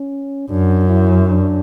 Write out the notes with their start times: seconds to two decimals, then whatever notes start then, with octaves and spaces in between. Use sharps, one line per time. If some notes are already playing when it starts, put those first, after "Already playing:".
Already playing: C#4
0.50 F#2 D4
0.89 E4
1.29 D4